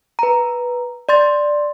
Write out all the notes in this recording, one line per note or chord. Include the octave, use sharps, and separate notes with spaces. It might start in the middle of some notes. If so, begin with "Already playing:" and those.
B4 A#5
D5 C6 A6